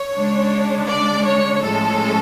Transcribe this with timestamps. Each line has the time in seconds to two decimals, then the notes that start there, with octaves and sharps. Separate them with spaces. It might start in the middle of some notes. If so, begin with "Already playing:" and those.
Already playing: C#5
0.15 C#3 G#3 D4
0.89 D5
1.26 C#5
1.62 A2 F3 G#3 C#4 A4